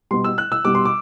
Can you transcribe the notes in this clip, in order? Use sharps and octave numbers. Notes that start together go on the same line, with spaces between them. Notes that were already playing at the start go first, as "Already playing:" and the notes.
B2 G3 C6
E6
F#6
E6
B2 G3 D6
C6
D6